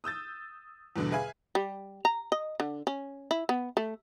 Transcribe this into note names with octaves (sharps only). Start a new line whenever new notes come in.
D#6 E6 G6 A6
E2 G2 B2 D3
G#4 B4 E5 F5 G#5
G3
A#5
D#5
D3
C#4
E4
B3
A3